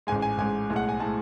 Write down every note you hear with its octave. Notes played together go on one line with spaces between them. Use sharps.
A1 G#2 G#3 G#5
G#5
A1 G#2 G#3 G#5
B1 A2 G#3
F#5
G#5
A2 G#3 A5